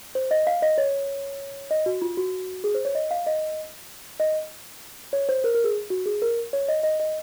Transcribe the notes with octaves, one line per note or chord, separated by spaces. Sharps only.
C5
D#5
F5
D#5
C#5
D#5
F#4
F4
F#4
G#4
C5
C#5
D#5
F5
D#5
D#5
C#5
C5
A#4
A#4
G#4
F#4
G#4
A#4
C#5
D#5
D#5
D#5